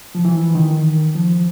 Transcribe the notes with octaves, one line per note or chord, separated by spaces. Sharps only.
F3
E3
D#3
F3